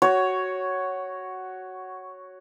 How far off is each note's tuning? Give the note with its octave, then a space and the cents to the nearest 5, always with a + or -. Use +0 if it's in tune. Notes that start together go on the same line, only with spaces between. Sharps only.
F#4 +10 C#5 +0